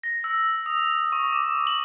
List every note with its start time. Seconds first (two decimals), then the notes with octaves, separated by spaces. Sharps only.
0.03 A#6
0.24 E6
0.66 D#6
1.12 C#6
1.33 D6
1.67 F#7